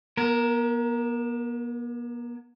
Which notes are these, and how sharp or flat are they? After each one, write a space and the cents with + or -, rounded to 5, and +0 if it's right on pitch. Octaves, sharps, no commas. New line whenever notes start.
B3 -45 A#4 +0